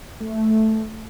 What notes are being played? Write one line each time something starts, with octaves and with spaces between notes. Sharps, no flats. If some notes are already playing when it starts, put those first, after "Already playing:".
A3